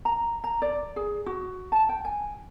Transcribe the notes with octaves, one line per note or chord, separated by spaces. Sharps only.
A#5
A#5
D5
G#4
F#4
A5
G5
G#5